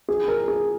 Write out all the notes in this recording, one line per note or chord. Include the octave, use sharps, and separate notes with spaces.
G#4
A#4
G#4